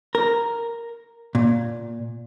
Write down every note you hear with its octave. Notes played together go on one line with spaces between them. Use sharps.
A#4
A#2